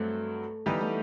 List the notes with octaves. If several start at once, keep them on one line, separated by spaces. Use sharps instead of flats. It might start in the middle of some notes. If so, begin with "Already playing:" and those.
Already playing: G2 F#3 A3 C4
E3 G3 B3 D#4 G4 B4
A3